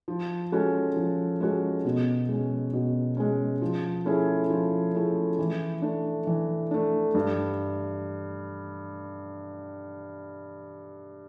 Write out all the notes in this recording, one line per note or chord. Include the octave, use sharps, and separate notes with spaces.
F3
G#3 C#4 F#4 A4
F3
G#3 C#4 F#4 A4
B2
G#3 C#4
B2
G#3 C#4
F3
A3 C#4 E4 G#4
F3
A3 C#4 E4 G#4
E3
A3 D4
E3
A3 D4
G2